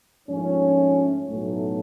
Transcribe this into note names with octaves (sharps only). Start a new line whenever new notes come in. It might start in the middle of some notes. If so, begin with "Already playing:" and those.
A#1 G#2 F3 A3 C#4
B1 A2 F#3 A3